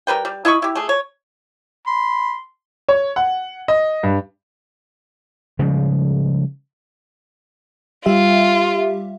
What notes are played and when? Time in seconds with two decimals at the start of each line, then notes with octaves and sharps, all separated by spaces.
0.07 G3 A#4 B4 G5
0.25 G3
0.45 E4 D#5 B5 C#6
0.62 E4 G4
0.75 A3 G#4
0.89 C#5
1.87 B5 C6
2.89 C#5
3.16 F#5
3.68 D#5
4.03 G2
5.59 C#3 F3 G3 G#3
8.06 G3 F4 G4 E5